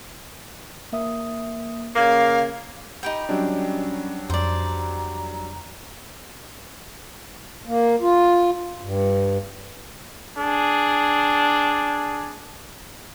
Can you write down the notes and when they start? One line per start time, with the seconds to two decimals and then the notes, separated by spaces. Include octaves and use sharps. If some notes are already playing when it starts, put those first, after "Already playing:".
0.92 A#3 E5 D#6
1.96 C#3 A#3 F5 G#6
3.03 D#4 G4 G5 B5
3.29 F#3 G3 C#4 D4
4.30 F2 C5 D5 A#5
7.67 A#3
8.01 F4
8.82 G2
10.38 D4 G#4